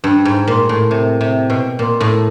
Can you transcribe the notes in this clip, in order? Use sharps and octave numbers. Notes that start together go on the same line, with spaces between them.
G2
G#2
A#2
A2
C3
C3
B2
A#2
A2